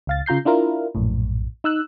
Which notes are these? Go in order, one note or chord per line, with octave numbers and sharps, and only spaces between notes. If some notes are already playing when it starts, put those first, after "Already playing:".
C#2 F5 A6
C#3 F4 A#5 G6 C7
D4 E4 F4 A#4
A#1 F#2 A2
D#4 E6 F#6